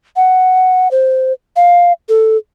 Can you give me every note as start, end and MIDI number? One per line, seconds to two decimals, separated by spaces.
0.16 0.91 78
0.91 1.33 72
1.56 1.93 77
2.09 2.37 69